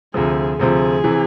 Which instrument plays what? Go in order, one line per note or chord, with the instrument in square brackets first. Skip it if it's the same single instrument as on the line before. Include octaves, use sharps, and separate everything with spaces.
[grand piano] D2 C3 F3 [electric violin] G#4
[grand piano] D2 C3 F3 [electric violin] G#4
[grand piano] C3 E3